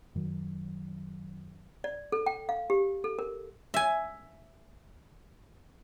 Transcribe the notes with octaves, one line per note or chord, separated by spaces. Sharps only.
F#2 D#3 F#3
D5
A4
G5
F5
G4
A4
A#4
E5 G#5